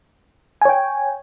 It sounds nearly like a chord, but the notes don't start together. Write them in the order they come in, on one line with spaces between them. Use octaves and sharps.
G#5 C#5 G5